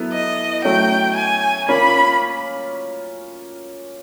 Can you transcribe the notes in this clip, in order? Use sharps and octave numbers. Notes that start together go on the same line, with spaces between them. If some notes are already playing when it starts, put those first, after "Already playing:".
Already playing: F#3 B3 E4 A4
D#5
F#3 A3 C#4 G5
G#5
A#3 C#4 F4 B5